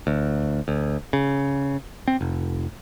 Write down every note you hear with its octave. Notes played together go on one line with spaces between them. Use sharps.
D2
D2
C#3
C4
F1